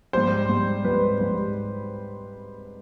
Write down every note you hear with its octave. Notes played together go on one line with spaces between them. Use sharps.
G#2 G3 C5
G#2 G3
G#2 G3 B4
G#2 G3